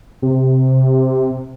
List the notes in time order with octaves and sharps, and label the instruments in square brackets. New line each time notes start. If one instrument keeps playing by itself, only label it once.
[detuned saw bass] C3